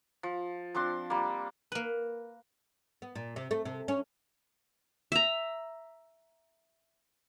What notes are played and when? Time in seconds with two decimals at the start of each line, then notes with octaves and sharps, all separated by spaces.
0.23 F3
0.74 F3 C4 D4 C6
1.10 G3 A#3
1.72 A#3 B4
3.02 B3
3.15 A#2
3.36 C3
3.51 A3
3.65 C3
3.88 C#4
5.12 E5 A#5